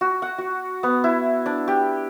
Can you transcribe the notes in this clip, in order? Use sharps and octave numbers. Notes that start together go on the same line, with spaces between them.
F#4
F#5
F#4
B3
E4
D4
G4